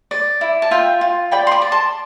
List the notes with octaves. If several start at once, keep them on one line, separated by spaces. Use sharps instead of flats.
D5
E4
A5
F4 E5 G5
F4
D5 G5 B5
C6
B5 D6
D5
A5 C6